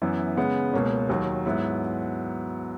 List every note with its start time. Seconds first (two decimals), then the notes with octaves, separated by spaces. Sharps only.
0.02 F#2 E3 B3 E4
0.37 C#3 G#3 B3
0.73 C#2 B2 A#3 C#4
1.09 D#2 D#3 F#3
1.46 G#2 F#3 B3 E4